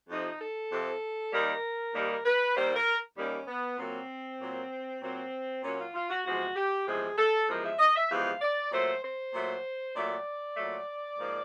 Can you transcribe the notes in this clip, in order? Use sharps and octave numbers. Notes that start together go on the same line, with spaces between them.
F2 C3 F3 D#4
A4
F2 C3 F3
D#2 D#3 G3 A#3 A#4
D#2 D#3 G3 A#3 A#4
B4
D#2 D#3 G3 A#3 C5
A#4
D#2 D#3 G3 A#3 C#4
B3
A#2 F#3 A#3 C4
A#2 F#3 A#3
A#2 F#3 A#3 C4
A#2 F#3 A#3 C#4
F4
F4
F#4
E2 C3 F3 G#3 F#4
G4
E2 C3 F3 G#3 G#4
A4
E2 C3 F3 G#3 A#4
E5
D#5
E5
E2 C3 F3 G#3 F5
D5
A#2 F#3 A3 C5
C5
A#2 F#3 A3
A#2 F#3 A3 D5
A#2 F#3 A3
G#2 F3 A#3